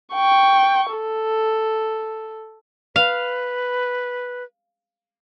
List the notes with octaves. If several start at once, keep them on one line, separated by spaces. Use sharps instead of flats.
G5 C#6
A4
B4 F5